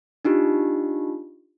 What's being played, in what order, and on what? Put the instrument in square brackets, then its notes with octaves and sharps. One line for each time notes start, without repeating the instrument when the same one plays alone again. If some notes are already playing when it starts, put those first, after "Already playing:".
[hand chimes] D4 D#4 F4 G4